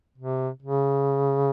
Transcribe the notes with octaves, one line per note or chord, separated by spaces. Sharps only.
C3
C#3